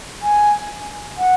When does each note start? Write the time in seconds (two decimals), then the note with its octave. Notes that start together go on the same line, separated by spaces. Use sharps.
0.22 G#5
1.18 F#5